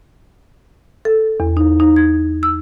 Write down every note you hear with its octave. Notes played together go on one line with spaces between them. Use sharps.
A4
E2
D#4
D#4
G#6
E6